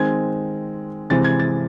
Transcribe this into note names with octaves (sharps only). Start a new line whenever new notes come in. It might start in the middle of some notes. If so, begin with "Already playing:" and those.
Already playing: D#3 G#3 C4 G#6
C3 E3 G#3 C4 A6
G#6
A6